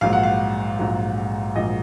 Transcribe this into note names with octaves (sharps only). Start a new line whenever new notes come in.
A#1 G#2 F#3 F5
F#5
F5
A#1 G#2 F#3
A#1 G#2 F#3 D#5